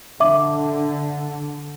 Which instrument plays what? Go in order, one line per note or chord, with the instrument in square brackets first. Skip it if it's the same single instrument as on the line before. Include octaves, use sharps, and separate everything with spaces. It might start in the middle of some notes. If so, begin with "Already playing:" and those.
[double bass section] D3 [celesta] E5 D6